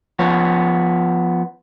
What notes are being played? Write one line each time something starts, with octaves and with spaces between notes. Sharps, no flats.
F3 B3 C#5